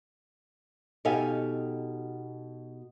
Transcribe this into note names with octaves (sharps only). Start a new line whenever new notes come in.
B2 D#4 G4 A4 F5 G#5